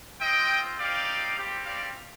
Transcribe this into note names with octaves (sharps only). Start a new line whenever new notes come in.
C4 F4 D#5 G5
C4 D#4 G4 D5 F5
G3 C4 G4
D5 F5